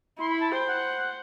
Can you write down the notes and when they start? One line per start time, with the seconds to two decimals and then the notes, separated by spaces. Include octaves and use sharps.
0.19 E4 C6
0.30 B5
0.40 A5
0.51 C5 G5
0.68 F#5